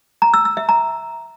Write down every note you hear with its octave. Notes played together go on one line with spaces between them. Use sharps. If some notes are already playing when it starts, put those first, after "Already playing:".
A#5
E6
E6
E5
A#5